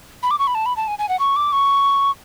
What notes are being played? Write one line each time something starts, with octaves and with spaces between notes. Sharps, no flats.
B5
D6
C#6
B5
A5
B5
A5
G#5
G#5
F#5
C#6
D6
C#6